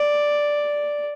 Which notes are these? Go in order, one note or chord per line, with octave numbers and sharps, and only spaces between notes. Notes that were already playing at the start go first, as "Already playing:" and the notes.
Already playing: D5